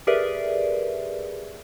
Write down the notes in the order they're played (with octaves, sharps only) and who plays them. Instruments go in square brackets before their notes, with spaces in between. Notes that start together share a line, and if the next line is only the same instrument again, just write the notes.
[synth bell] G4 G#4 A#4 B4 D5 E5